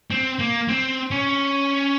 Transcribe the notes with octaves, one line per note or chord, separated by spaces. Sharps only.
C4
A#3
C4
C#4